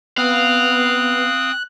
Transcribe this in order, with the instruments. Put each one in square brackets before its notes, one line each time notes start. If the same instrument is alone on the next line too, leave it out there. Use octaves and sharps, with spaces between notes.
[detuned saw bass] B3 [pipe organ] C4 D#6 [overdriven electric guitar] F5 [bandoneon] F#6